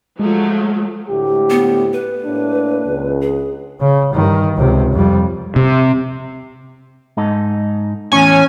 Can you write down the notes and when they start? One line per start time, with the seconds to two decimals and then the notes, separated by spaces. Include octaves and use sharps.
0.20 F3 F#3 G#3 A3
1.09 D2 A2 G4
1.50 B3
1.93 B4
2.25 A2 A#3 D4
2.85 C#2
3.21 G#4
3.81 C#3
4.14 G2 D#3
4.56 C#2 C3
4.92 F2 G3
5.56 C3
7.17 G#2 D#4 A4
8.12 E2 A2 C#4 G#5